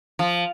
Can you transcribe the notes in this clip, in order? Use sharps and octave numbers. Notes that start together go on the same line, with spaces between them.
F3